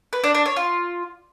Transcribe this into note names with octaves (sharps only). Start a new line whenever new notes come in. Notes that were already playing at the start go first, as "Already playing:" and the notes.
B4
D4
D4
C#5
F4